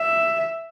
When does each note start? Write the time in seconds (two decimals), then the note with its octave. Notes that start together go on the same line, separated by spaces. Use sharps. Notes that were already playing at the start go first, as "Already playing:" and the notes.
Already playing: E5